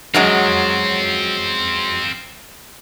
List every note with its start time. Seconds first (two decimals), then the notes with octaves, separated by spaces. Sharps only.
0.14 F#2 F#3 G#3 C4 F4